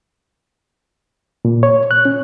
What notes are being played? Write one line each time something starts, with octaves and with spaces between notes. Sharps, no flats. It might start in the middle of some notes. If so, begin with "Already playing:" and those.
A#2
C#5
F#6
C#4